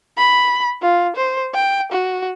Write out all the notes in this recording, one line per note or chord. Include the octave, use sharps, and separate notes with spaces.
B5
F4
C5
G5
F#4